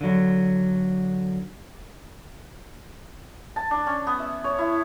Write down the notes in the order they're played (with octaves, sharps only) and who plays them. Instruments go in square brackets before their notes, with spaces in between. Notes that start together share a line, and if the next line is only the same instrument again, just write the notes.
[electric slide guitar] D3 F#3
[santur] A5
D4
C#4
B3
E5
C#5
E4